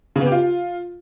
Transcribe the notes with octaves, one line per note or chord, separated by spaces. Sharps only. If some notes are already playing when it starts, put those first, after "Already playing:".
C#3
B3
G4
F4